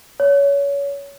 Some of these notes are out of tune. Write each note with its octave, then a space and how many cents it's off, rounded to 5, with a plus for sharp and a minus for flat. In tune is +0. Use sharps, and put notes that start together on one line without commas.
C#5 +25